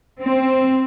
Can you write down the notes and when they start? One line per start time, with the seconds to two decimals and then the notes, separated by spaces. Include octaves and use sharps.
0.20 C4